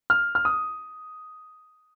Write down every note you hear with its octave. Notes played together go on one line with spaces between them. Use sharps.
F6
F6
D#6